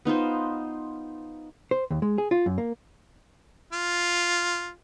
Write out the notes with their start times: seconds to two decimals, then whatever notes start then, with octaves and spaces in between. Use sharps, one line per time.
0.05 B3 D#4 F4 C5
1.71 C5
1.91 D#2
2.02 G#3
2.18 G#4
2.31 F4
2.46 F#2
2.58 A#3
3.72 F4